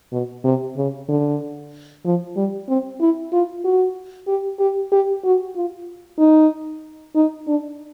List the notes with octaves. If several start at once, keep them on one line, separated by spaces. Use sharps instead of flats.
B2
C3
C#3
D3
F3
G3
C4
E4
F4
F#4
G4
G4
G4
F#4
F4
D#4
D#4
D4